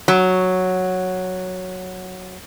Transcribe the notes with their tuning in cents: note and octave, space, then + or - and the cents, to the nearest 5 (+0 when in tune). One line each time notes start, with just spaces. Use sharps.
F#3 -5